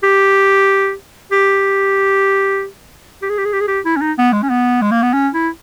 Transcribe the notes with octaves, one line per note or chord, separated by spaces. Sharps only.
G4
G4
G4
G#4
G4
G#4
G4
G#4
G4
E4
C#4
D#4
B3
G#3
C#4
B3
G#3
A#3
B3
C#4
E4